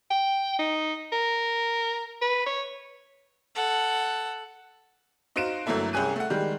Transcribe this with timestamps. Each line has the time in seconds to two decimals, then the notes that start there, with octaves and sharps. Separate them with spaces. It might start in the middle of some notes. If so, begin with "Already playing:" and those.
0.11 G5
0.59 D#4
1.12 A#4
2.22 B4
2.46 C#5
3.55 A4 F#5
5.36 D#4 F#4 C5 F5 D7 E7
5.66 G1 F#3 A3 A#3 E4 A4
5.93 C2 C#4 G4 G#4 F#6 D#7
6.16 A3 F#5
6.30 D#3 G3 G#3